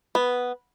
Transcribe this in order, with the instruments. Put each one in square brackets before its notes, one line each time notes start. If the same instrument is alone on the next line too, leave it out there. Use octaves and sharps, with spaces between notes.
[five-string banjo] B3